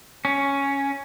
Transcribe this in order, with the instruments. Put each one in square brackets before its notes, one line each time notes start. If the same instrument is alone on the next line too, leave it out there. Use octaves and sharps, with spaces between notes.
[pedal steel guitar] C#4